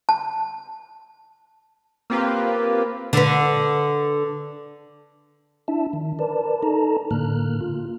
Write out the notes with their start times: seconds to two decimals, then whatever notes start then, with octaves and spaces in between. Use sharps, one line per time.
0.09 A5
2.10 A#3 C4 F4 G4 B4
3.13 D3 B4
5.68 D4 E4 E5 A5
5.93 D#3
6.19 A#4 B4 D5 A5
6.63 D#4 A4 A5 A#5
7.11 A2 D3 A#3 F6 F#6
7.61 F4